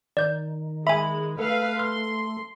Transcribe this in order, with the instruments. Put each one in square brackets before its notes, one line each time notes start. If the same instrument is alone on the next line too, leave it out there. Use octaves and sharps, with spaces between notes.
[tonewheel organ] D#3 [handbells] D5 G6
[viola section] G#3 [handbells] E5 G#5 [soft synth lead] B5
[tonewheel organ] A3 [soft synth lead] A4 [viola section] B4 F5
[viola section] C6 [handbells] F6